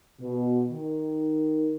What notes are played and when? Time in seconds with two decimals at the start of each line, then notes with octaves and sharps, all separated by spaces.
0.20 B2
0.70 D#3